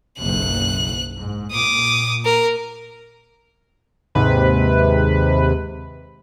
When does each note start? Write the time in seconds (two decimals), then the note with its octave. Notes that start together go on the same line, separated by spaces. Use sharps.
0.19 F#1 B1 F#6
1.16 G#2
1.51 A#2 D6 D#6
2.25 A#4
4.15 D#2 G#2 C3 B4